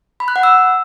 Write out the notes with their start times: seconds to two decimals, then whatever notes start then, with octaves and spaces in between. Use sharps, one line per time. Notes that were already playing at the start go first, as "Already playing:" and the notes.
0.20 B5
0.28 F#6
0.36 F#5
0.43 E6